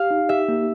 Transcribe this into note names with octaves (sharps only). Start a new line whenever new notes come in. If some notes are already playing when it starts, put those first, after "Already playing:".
Already playing: G4 F5
D#4
G4 E5
A#3